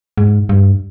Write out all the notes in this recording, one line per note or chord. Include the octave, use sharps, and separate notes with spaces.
G#2
G2